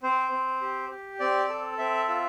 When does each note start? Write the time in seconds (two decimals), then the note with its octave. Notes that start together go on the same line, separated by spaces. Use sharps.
0.03 C4 C5
0.32 C4
0.61 G4
0.91 G4
1.20 C4 D5
1.49 A4
1.78 C4 E5
2.08 F4